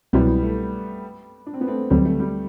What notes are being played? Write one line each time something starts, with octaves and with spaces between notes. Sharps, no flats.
C2 B2 F#3 G3 B3 C4 E4
A3
D4
C4
B3
A3 C4
D2 D3 F#3 G3 C4
A3
G3